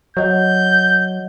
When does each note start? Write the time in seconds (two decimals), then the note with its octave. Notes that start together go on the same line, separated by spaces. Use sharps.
0.17 F#3 C#5 D#5 F#5 G6